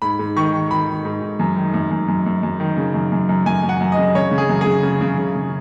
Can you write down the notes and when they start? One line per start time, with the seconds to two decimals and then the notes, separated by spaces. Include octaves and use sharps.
0.02 G#2 B5
0.19 G#2
0.36 D#3 C#6
0.53 D#3
0.71 D#3 B5
0.88 D#3
1.05 G#2
1.22 G#2
1.39 F#2
1.56 D#3
1.74 F#2
1.91 F#2
2.08 F#2
2.26 F#2
2.43 F#2
2.60 D#3
2.77 C#3
2.94 F#2
3.12 F#2
3.29 F#2
3.46 F#2 G#5
3.63 F#2
3.69 F#5
3.80 F#2
3.92 D#5
3.98 C#3
4.15 C#3 C#5
4.31 C#3
4.38 G#4
4.49 F#2
4.61 C#3 G#4
4.83 C#3
5.01 C#3
5.18 C#3
5.35 C#3